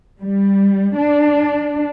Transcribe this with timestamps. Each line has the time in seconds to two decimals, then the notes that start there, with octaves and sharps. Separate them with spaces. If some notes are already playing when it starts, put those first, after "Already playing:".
0.21 G3
0.97 D4